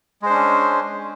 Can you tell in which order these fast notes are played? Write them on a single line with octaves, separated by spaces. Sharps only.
G#3 C5 D4 C#4